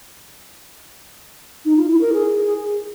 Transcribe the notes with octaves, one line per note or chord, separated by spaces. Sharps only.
D#4
F4
E4
A#4
G#4